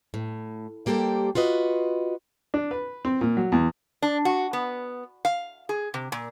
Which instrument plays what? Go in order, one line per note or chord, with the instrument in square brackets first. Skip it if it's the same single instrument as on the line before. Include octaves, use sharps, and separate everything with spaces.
[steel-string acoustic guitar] A2
G3 A#3 G4 A4 C5
F4 F#4 B4 D#5
[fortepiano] D4
B4
C4
A#2
F#3
E2
[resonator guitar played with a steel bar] D4
F#4
B3
F5
G#4
C3
A#2